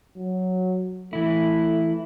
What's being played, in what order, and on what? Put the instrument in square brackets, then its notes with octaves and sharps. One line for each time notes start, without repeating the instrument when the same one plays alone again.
[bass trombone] F#3
[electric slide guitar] E3 E4 [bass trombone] A3